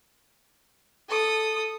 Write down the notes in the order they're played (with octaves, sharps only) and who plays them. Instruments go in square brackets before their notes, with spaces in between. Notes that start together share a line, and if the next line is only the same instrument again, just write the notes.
[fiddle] A4 D#6